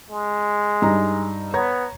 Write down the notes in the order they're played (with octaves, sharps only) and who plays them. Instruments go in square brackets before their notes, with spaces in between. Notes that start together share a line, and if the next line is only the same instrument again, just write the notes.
[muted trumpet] G#3
[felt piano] G2 D#4 A#5
[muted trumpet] B3 [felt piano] C#5 A#5 G#6